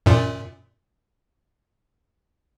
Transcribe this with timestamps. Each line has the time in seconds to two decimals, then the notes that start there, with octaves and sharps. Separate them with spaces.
0.06 F#2 A#2